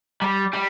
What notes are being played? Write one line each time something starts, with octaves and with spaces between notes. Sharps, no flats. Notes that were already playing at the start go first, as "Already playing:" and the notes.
G3
G3